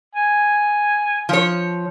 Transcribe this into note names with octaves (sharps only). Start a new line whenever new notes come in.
G#5
F3 C#5